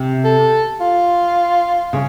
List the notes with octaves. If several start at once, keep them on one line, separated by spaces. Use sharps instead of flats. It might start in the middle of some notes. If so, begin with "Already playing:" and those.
Already playing: C3
A4
F4
C#3